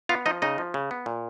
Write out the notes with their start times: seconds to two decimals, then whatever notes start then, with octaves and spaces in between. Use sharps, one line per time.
0.09 B3 F4 F5
0.26 F3 D#4 D#5
0.42 C#3 D#4 D#5
0.58 F3
0.74 C#3
0.91 B3
1.06 A#2